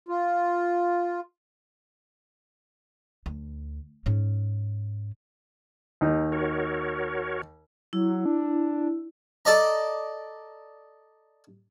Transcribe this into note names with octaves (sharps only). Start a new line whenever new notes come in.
F4
D2
G#2 C#4
D#2 D#4
F#4 A#4 C#5
F#3 E4
D4
A4 D5 D#5 A#5